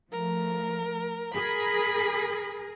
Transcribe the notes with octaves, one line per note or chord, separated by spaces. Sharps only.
F3 A3 A#4
G#4 A#4 B5